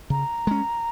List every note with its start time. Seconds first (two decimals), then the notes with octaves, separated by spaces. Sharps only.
0.10 C#3 A#5
0.47 G#3 C#4